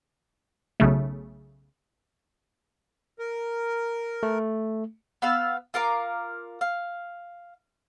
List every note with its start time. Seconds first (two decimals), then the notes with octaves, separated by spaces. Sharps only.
0.80 B1 C#3 A3
3.19 A#4
4.23 A3
5.22 B3 F5 E6
5.74 F4 A#4 F5 D6
6.61 F5